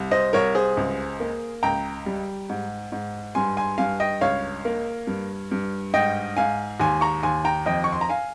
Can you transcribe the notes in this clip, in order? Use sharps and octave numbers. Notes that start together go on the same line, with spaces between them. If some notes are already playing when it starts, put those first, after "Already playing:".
Already playing: C2
C5 D#5
C2 A#4 C#5
G#4 C5
C#2
A#3
C#2 G5 A#5
G3
G#2
G#2
G2 G#5 C6
G#5 C6
G2 F5 G#5
D#5 G5
C#2 C#5 F5
A#3
G2
G2
G#2 D#5 G5
G#2 F5 G#5
D#2 G#5 C6
A#5 C#6
D#2 G#5 C6
G5 A#5
F2 D#5 G5
C#6
C6
A#5
F5 G#5